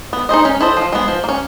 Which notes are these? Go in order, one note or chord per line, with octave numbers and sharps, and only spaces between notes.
B3
D#4 G#4 C5 D#5
C#4
E4 A4 C5 D#5
F3
G#3 B3
F3
A#3
C#4